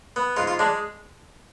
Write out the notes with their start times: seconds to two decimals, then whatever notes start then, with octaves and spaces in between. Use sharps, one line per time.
0.16 B3
0.37 G#2 F4
0.47 F4
0.59 G#3 D4